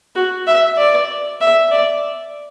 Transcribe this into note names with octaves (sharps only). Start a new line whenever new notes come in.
F#4
E5
D5
E5
D5